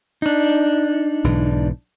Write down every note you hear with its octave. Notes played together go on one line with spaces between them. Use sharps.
D4 D#4
B1 G#2 E3